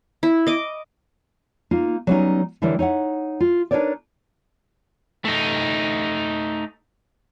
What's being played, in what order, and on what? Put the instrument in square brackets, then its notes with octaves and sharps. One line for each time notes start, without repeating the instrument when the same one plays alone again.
[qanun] E4
D#5 D6
[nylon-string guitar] A#3 D#4 F4
F#3 G3 A3 B3 C#4 D#4
D3 E3 G3 E4 A#4 C#5
D#4 C#5 E5 F#5
F4
D4 D#4 A#4 B4 C#5 D5
[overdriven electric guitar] A3 D#4